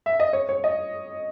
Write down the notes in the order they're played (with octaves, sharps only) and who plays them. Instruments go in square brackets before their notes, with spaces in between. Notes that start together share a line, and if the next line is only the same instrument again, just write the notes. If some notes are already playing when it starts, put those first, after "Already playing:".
[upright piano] E5
D#5
C#5
C#5
D#5